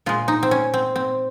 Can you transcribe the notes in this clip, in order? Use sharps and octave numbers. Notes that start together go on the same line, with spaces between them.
A#2 G#3 F4
D#4
C4
C#4
C4
C4